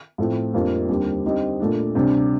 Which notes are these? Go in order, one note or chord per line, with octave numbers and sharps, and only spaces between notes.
A2 F3 A3 C4
F2 D3 G3 A#3 F4
D#2 D3 G3 C4
D3 G3 C4 D#4
A#2 A3 D4
D2 C3 G3 D4